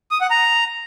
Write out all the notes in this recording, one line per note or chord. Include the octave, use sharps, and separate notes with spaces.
D#6
F#5
A#5